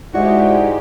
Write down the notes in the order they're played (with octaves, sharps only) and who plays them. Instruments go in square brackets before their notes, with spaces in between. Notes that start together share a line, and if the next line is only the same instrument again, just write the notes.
[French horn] G#2 [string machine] G#3 G4 [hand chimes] E4 D5 E5 [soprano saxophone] F#4